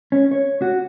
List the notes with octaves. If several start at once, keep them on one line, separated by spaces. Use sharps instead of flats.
C#4
C#5
F#4